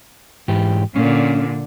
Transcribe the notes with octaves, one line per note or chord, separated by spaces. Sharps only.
G#2 E3 G4
A#2 D3 C#4